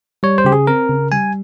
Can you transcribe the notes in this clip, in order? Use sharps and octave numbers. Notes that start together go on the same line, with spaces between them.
G3 C#5
C5
C#3 G4
G#4
C4 A#4
C#3
G3 G#5